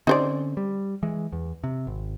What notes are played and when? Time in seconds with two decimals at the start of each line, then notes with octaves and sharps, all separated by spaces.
0.07 D3 C4 C#4 D#4 C5 D5
0.57 G3
1.03 E3 G#3
1.33 E2
1.64 C3
1.87 G#1